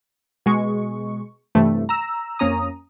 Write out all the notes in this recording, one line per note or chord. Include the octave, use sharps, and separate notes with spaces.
B2 G#3 C#6
G2 C3 E3 A3
A#5 E6
F2 A#3 C#4 A#5 D#6